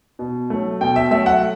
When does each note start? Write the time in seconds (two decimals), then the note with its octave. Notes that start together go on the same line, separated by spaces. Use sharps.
0.19 B2
0.50 F#3 A3
0.81 B2 G5
0.96 E5
1.11 F#3 A3 E5
1.26 F#5